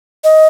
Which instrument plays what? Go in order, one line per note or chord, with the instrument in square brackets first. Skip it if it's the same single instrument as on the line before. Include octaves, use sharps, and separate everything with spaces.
[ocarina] D#5